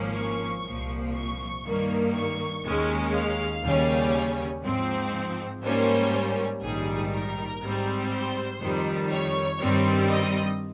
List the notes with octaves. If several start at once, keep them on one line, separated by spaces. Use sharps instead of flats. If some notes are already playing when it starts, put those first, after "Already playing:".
Already playing: G#1 G#2 F3 A#3 C#4
C#6
C2 A#2 F3
C#6
G2 D#3 A#3
C#6
D#2 D#3 G#3 C#4
F5
D#2 C#3 G3 C#4
G#2 F3 C4
G#2 G3 A#3 C#4 C5
A#1 G#2 D#3 G3 G#4
A#4
G#2 G3 C4
C5
F2 D#3 G3
C#5
G2 D#3 G3 C4
D#5